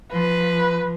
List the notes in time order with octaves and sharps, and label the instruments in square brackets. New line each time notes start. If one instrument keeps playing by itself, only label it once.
[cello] F3 [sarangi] B4